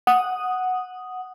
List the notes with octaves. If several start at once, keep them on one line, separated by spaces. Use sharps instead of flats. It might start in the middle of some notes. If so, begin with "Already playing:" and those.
F#5 D#6